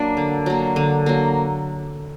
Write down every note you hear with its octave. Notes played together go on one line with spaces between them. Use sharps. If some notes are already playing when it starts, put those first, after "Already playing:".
Already playing: F#3 A#3 D4
D3
F#3 A#3
D3
F#3 A#3